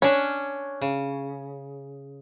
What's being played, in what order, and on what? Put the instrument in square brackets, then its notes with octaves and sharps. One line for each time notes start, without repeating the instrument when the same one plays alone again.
[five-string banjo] C#4 [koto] D4 C#5
[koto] C#3